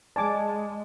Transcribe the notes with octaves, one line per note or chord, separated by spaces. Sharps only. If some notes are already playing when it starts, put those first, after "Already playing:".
G#3 D5 G#5 A5 D6